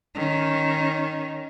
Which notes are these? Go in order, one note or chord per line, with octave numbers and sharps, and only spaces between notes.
D#3 C#4